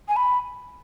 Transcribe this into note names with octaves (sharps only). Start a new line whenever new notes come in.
G#5
B5